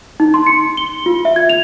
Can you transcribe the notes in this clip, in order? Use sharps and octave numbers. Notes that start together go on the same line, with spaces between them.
D#4
C6
C#7
G7
F4
E5
G#6
F7